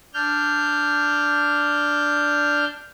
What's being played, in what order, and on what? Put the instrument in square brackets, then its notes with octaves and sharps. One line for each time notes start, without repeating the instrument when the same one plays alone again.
[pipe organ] D4 F6 G6